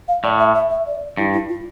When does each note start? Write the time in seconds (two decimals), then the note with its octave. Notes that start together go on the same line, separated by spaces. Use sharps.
0.08 F5
0.24 A2 D5
0.40 E5
0.54 E5
0.70 E5
0.87 D5
1.17 G2 E4
1.34 E4
1.49 F4